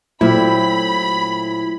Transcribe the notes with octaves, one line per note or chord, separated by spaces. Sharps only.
A#2 F#3 A3 C4 E4 E5 B5